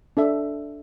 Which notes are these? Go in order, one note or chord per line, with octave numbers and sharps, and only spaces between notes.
D4 A4 E5